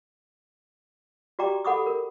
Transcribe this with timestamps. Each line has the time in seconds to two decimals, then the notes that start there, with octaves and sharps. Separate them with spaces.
1.39 F#4 G4 D5 G5 A#5 D6
1.65 A4 F#5 B5 D6 D#6
1.86 A#4